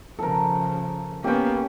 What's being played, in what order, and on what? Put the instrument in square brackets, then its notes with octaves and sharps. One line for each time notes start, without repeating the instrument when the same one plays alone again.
[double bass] C#3 F3 [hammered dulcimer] A4 A#4
[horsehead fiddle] A#3 B3 [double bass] C#4 [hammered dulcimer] G4 G5